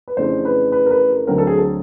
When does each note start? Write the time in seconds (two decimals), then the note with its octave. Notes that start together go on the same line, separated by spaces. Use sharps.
0.08 B4
0.17 F2 C#3 E3 A3 D4 C5
0.45 B4
0.72 B4
0.86 A#4
0.91 B4
1.09 A#4
1.27 D2 D3 F#3 A3 C4 A#4
1.38 A4
1.47 G#4
1.58 A4